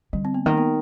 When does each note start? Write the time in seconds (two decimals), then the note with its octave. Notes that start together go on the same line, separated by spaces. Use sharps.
0.13 D3 G3
0.25 C4
0.34 B3
0.46 D#3 A#3
0.57 B3